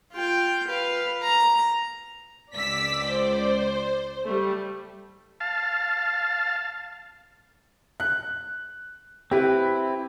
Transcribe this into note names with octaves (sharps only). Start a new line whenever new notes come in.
F4 G5
B4 F5
A#5
C#2 D5 E6 B6
C5
G3 A3
F5 A5
F#6
C4 E4 G4 B4